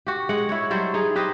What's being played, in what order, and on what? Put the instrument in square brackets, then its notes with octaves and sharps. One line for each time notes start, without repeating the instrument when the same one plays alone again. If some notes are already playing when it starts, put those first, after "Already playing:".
[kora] F#4 G4
G#3 F#5
E4 C#5
F#3 G3 E4 C5
D#4 G#4
G4 B4 C5 D#5